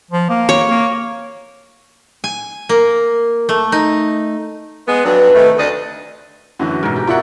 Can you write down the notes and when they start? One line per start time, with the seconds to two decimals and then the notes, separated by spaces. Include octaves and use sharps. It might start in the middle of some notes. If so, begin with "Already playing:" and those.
0.11 F3
0.29 A#3
0.49 C#5
0.69 A#3
2.24 G#5
2.69 A#3
3.49 A3
3.72 D#4
4.88 G#3 B3
5.05 F2 F#3 D4 B4
5.35 C3 D#3 A3
5.58 D2 D4 D#5
6.59 F#2 D3 E3 F#4
6.83 G#2 B2 A#4
6.96 G4
7.07 F4 A#4 C#5 D5 E5 F#5